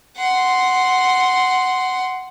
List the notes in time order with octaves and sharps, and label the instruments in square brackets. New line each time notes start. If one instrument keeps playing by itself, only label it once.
[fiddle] F#5 C6